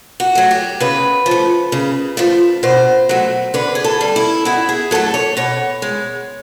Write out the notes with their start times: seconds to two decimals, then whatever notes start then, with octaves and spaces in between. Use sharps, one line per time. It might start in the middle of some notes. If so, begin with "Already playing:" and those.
0.20 F#4
0.35 F#3 A3
0.51 G4
0.80 C#3 B4
1.26 F3
1.31 A3
1.72 C#3
2.17 F3 A3
2.63 B2 C5
3.09 F#3 A3
3.54 D3 B4
3.75 G#4
3.84 A4
4.01 G3
4.16 E4
4.45 B2 E4
4.69 G#4
4.91 F#3 A3 A4
5.14 C#5
5.37 B2 C#5
5.82 G#3